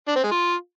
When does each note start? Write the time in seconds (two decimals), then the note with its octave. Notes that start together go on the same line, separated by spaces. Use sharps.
0.08 D4
0.16 C4
0.24 G#3
0.31 F4